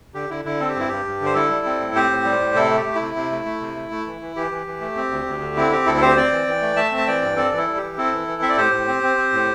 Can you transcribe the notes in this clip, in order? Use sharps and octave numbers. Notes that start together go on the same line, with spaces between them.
D3 G4
D3 E4
D3 E4
C4 A4
G4
G2 E4
G2 G4
G2
D3
C5
G3 E4 A4
G3
C4
A2
C4 G4 C5
A2
G3
A2
C3 E4 A4
A3
G4
A3
E4
C3
C3
A3
A3
C3
A3
A3
E3
E3
E3 G4
E3
E3
A3
C4
D2
D2
D3
C4 E4
C4 G4
D2 E4 A4
A4
C4 G4 C5
C4 D5 G5
E3
E3
A3
A3 E5 A5
C4
A5
E3 D5 G5
G2
C4 A4 D5
E3
E4 A4
G3
E3 G4
C4 E4 A4
E3
E3
C4 E5
D5
A2 G4 C5
A2
C4
C4
C4
A2